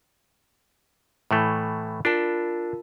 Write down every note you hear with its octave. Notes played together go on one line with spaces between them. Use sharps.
A2 E3 A3
D4 F4 A#4 A5